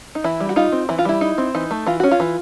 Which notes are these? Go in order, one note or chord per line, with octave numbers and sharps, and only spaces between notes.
D#4
E3 E4
G3
F#4
D#4 F4
C4
E3 E4
F4
G3 E4
D#4
C4
E3 D#4
A3
E3 F4
C#4 F#4
F4
E3